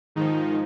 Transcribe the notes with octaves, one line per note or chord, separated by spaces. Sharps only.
G#2 D#3 F3 D#4